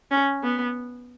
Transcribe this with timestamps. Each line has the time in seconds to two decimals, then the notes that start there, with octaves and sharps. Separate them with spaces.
0.11 C#4
0.43 B3